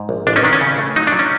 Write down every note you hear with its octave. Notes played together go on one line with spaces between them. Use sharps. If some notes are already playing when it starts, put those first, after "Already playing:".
Already playing: G#2
A#1
A1 D4
C#4 D#4
D#3 D4
C#4
C#3
A3
F#3 D#4
D4
F#3
C#4